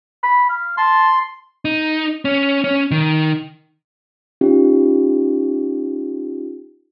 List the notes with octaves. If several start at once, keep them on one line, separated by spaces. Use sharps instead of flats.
B5
F5
A5 C6
D#4
C#4
C#4
D#3
C#4 D#4 F4 G4